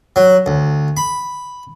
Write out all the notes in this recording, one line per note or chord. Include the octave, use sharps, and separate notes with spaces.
F#3
D2
B5